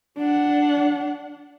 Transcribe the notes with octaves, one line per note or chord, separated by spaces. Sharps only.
D4 F#5